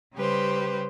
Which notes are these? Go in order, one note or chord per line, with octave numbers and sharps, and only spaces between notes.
C#3 G3 G4 B4 C5